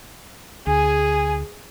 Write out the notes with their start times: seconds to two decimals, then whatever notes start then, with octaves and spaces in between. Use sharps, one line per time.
0.67 D2 G#4 G#5